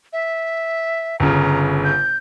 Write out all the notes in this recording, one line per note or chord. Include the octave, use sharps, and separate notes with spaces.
E5
G1 C#3 A#5
G6